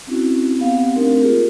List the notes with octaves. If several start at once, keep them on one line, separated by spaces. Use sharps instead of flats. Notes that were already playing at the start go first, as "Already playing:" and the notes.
C4 C#4 E4 F#4
B3 C4 G4 F5 F#5
A3 C4 D4 D#4 A#4
A#3 F4 G4 G#4 A#4